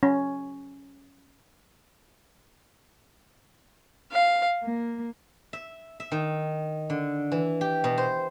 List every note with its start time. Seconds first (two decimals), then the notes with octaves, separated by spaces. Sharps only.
0.03 C#4
4.11 F5
4.64 A#3
5.53 E5
6.00 E5
6.12 D#3
6.90 D3
7.32 E3
7.61 G4
7.84 B2
7.98 C5